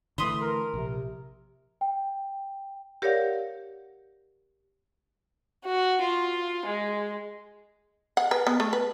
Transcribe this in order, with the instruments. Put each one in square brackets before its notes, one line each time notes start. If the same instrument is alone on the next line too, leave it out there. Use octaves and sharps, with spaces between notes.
[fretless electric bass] D3 E3 A3 [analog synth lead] B5 [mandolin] C6 D#6
[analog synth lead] A#4
[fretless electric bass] A#1 [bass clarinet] C3
[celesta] G5
[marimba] G4 A#4 C#5 D5 F5 F#5
[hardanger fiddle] F#4
F4
G#3
[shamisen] F#5
B4
B3
A3
B4